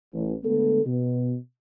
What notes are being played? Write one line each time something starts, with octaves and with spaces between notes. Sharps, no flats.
A1
D3 G#3 A3 B3 A4
B2